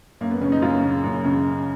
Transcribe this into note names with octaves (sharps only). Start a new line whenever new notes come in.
F#2 A#3
B3
C#3 C#4
D#4
F#2 F4
C#3
F#2
C#3